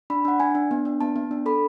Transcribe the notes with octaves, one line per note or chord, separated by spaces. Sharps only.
D4 B5
D4 F#5
D4 G#5
D4
B3
D4
B3 A5
B3
D4
A4 B5